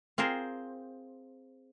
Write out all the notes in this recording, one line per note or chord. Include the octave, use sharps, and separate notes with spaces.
C4 F4 G#4 A#4 C5